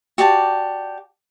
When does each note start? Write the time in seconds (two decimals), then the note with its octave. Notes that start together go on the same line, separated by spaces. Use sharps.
0.18 F#4 G4 D5 A5